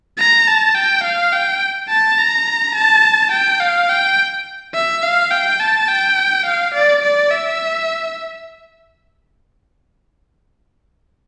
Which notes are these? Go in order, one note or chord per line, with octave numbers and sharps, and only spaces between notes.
A#5
A5
G5
F5
G5
A5
A#5
A5
G5
F5
G5
E5
F5
G5
A5
G5
F5
D5
D5
E5